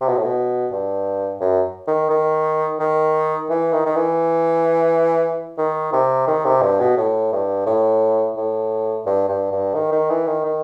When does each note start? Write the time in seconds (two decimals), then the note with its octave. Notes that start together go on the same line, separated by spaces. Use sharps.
0.01 C3
0.08 B2
0.17 A2
0.25 B2
0.71 G2
1.40 F#2
1.87 D#3
2.10 D#3
2.79 D#3
3.50 E3
3.73 D#3
3.86 D#3
3.96 E3
5.58 D#3
5.92 C3
6.27 D#3
6.45 C3
6.62 G2
6.80 B2
6.97 A2
7.32 G2
7.66 A2
8.37 A2
9.06 G2
9.28 G2
9.52 G2
9.75 D#3
9.92 D#3
10.10 E3
10.27 D#3
10.45 D#3